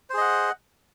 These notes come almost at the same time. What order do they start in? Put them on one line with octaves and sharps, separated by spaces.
C5 G#4 D#5 F#5